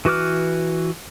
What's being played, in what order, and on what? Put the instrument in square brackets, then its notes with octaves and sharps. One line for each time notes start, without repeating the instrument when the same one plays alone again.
[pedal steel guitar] E3 F#4 B4 D6 F6